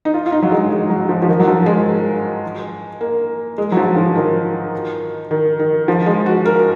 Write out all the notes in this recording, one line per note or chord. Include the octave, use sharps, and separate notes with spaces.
D#4
F4
F4
D#4
F#3
G#3
G#3
F#3
F3
F3
D#3
F#3
F3
G#3
A#3
G#3
F#3
F3
F3
D#3
D#3
D#3
F3
G#3
F#4
A#4